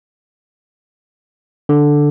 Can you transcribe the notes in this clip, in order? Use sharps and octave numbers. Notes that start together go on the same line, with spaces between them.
D3